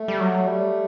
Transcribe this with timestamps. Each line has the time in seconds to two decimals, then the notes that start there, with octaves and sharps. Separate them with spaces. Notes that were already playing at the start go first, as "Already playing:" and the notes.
Already playing: A3
0.08 G3
0.20 F#3
0.46 G3